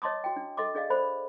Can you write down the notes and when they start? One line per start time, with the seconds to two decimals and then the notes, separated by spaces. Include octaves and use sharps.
0.02 C#5 D#5 A5 C6 D6 D#6
0.24 F#4 G5
0.36 D4
0.57 A4 D#5 C6 D6
0.75 D4 G#4 D5 D#5 F5
0.90 A4 C5 D5 B5